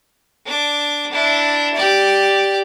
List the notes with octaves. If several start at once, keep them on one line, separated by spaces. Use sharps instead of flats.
D4 D6
D4 E4
G4 D5